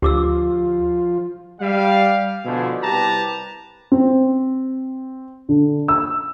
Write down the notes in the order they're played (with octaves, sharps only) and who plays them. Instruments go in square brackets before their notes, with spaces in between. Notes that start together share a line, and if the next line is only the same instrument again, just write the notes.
[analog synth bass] D2 [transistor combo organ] F3 F4 [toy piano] G4 D6 E6
[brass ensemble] G3 F5
B2 D3 F3 A3 E4 G#4
C2 G4 B4 A5 A#5
[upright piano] C4
D3
E6